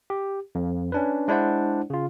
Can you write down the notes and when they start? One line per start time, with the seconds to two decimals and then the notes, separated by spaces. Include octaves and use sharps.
0.10 G4
0.55 F2
0.92 C#4 D4 B4
1.28 G#3 D4 E4 C5 D5 F#5
1.90 C#3 F4